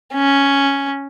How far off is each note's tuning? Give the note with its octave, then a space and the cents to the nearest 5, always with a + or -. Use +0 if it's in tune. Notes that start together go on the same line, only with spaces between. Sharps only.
C#4 +0